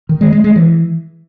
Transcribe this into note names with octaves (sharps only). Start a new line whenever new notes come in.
D#3
G#3
G#3
G#3
E3